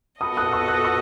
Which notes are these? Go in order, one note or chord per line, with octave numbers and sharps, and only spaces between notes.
B3 F#4 A4 D#5 B5 D#6
D#6 F#6
C#6 E6
D#6 F#6
C#6 E6